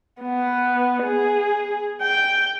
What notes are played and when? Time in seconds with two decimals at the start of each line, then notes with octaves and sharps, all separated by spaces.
0.22 B3
1.04 G#4
2.01 G5